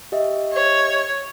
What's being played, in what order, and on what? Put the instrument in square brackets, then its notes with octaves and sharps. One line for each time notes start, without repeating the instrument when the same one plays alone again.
[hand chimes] G4 D#5 E5
[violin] C#5